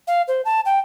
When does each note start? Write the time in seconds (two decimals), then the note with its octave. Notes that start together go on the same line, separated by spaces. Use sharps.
0.07 F5
0.28 C5
0.45 A5
0.66 G5